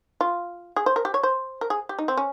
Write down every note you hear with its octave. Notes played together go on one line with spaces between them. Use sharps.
F4
G#4
C5
A#4
G4
C#5
C5
A#4
G#4
G4
D#4
C4
C#4